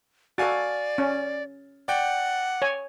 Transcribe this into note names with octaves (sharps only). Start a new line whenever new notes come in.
F#4 A4 D5 F5 G#5 A6
C#4
D5 F#5 G5
C#5 G#5